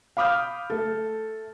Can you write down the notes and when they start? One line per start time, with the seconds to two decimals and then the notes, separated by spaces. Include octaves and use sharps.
0.17 F5 B5 D6 D#6 F6 G6
0.70 A3 A4